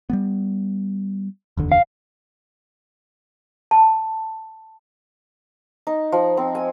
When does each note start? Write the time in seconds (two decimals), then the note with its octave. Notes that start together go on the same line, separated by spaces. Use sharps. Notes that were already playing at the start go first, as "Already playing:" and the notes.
0.10 G3 A3 B3
1.57 F1 D#2 D3
1.72 F5
3.71 A5
5.87 D#4
6.12 F3
6.37 C4
6.55 G#5